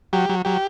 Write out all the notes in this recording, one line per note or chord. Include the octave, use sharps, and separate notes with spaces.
F#3 G4
F#3
F#3 G4